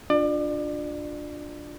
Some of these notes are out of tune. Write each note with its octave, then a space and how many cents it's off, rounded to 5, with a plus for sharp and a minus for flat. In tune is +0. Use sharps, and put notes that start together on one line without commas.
D4 +0 F4 +20 D5 +30